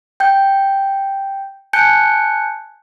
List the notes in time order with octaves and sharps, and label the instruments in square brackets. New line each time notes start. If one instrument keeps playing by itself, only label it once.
[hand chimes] G5 G6
G#5 A5 F#6 G6 C#7